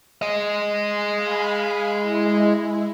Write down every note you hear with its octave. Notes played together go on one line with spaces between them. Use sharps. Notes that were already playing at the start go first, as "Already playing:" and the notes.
G#4 D#5
F5 G#5 B5
G#3 E4